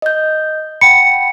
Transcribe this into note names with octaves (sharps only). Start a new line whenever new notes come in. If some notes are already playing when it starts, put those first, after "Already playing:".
D#5 G6
F#5 G5 B5 C#7